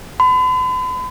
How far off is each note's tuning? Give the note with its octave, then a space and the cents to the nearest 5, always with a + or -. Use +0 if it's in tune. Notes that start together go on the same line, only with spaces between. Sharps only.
B5 +45